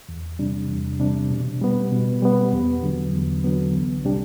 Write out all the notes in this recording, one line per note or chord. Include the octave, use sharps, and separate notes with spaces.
E2
C3 G3 D4
E2
C3 G3 D4
B2
G3 B3
B2
G3 B3
E2
D3 F#3 B3
E2
D3 F#3 B3
C2
C3 G3 D4 G4